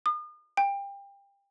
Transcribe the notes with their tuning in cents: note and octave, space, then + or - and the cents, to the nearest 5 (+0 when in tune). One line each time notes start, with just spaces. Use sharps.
D#6 -40
G5 +30